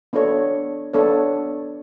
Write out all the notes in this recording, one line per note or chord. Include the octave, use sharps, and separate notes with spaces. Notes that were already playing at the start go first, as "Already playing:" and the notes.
B3 D4 A4 C#5
B3 D4 A4 C#5